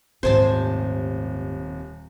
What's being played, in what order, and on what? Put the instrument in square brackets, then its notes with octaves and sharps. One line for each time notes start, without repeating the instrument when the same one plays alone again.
[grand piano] D#1 C3 [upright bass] G#2 A3 [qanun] C5 G#5 A5